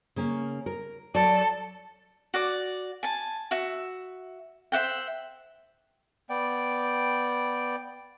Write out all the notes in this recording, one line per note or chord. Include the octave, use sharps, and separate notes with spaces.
C#3 A#3 C#4
A#4
F#3 A4 D5
F#4 D5 D6
G#5 A5
F#4 E5
C5 E5 F#5 G5
B3 D5 G5